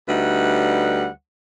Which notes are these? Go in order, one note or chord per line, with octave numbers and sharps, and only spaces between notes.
D2 G3 D#4 B4 F#5